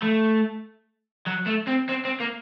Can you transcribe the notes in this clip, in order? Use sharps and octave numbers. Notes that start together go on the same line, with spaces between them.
A3
F#3
A3
C4
C4
C4
A#3